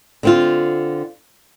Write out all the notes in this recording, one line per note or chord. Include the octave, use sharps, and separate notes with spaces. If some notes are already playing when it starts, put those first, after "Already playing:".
D3 C4 F4